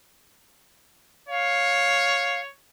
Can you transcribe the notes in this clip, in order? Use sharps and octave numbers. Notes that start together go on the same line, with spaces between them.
C#5 F5